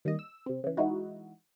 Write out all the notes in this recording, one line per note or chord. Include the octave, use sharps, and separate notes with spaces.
D#3 G3 A#3 D#5
E6
C3 C4
C#3 E3
E3 G#3 D#4 E4 F#4